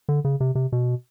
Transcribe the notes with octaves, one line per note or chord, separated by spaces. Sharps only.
D3
C#3
C3
C3
B2